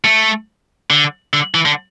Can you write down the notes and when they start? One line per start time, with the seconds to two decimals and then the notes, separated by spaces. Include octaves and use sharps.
0.05 A3
0.90 D3
1.33 D3
1.55 E3
1.66 D3